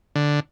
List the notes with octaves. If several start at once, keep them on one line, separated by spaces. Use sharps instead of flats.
D3